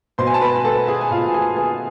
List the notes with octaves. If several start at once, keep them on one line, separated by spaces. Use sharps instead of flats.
B2 C5 C6
G#5
A5
B4 B5
B3 A4 A5
G#4 G#5
G#5
B2 F4 F5
G#4 G#5
B3 G#4 G#5